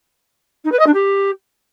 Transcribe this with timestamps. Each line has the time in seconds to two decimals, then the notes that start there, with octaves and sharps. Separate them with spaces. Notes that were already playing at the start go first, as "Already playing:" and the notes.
0.64 D#4
0.72 B4
0.79 D#5
0.86 D4
0.94 G4